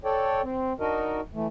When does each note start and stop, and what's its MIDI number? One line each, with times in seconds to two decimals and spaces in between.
0.05 0.41 69
0.05 0.41 73
0.05 0.41 74
0.05 0.41 79
0.43 0.73 60
0.80 1.21 62
0.80 1.21 63
0.80 1.21 66
0.80 1.21 70
0.80 1.21 75
1.34 1.47 52
1.34 1.47 57